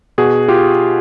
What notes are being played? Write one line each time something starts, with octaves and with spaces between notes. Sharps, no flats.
B2 F#4 G#4
F4 G4